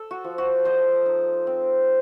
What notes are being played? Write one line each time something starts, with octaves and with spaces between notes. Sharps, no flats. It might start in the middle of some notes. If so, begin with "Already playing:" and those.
Already playing: A4
F#4
F3
F#4
F3 C5 D#5
D#4
C4